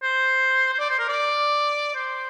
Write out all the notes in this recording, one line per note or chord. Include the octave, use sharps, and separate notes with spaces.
C5
C5
D5
C5
A#4
D5
C5